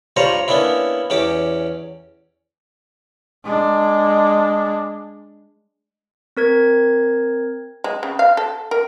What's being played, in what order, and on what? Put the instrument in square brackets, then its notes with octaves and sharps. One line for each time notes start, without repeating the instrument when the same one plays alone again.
[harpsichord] G2 G3 F4 C5 C#5 A#5
A#3 B3 C#4 D4 E4
E2 C#4 G4 D6
[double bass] G#3 D4
[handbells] C4 A#4 G#6
[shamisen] G#3
C#3
F5
A4
A#4